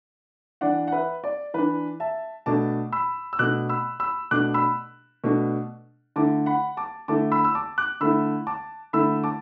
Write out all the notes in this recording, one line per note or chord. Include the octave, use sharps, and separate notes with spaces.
E3 D4 D5 F#5
F#5
B4 E5
D5
E3 D4 B4
E5 A5
B2 A3 D4 A5 D6
B5 E6
E6
B2 A3 D4 D6 F#6
B5 E6
B5 E6
B2 A3 D4 D6 F#6
B5 E6
B2 A3 D4
D3 A3 E4 A5 D6
F#5 B5
A5 D6
D3 A3 E4 A5 D6
B5 E6
E6
A5 D6
D6 F#6
D3 A3 E4 B5 E6
A5 D6
D3 A3 E4 B5 E6
A5 D6